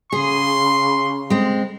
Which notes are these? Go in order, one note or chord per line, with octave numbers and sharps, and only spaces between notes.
C#3 G#4 C6
G#3 C4